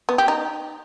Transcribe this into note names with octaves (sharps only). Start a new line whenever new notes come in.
B3
G4
D#4